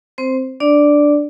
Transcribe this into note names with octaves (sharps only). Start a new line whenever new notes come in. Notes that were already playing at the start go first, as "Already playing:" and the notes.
C4 C5
D4 D5